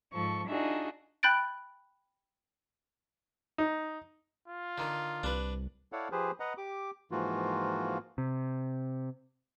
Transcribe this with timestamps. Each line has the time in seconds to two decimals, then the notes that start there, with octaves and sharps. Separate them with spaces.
0.12 G#2 F3 A4 C#6
0.47 D4 D#4 F4 F#4 G#4 E5
1.23 G5 B5 F#6 G6 A6 D7
3.58 D#4
4.48 F4
4.78 D3 D#3
5.23 C2 D4 B4
5.92 E4 A4 C#5 D5 F5 F#5
6.12 F3 G4 G#4 B4 C5
6.40 B4 D#5 F#5 A#5
6.57 G4 D6
7.11 G#2 E3 F3 A#3 F4 F#4
8.18 C3